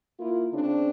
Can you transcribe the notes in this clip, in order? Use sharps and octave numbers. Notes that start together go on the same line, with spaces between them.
A#3 E4 F4
C#3 C4 D4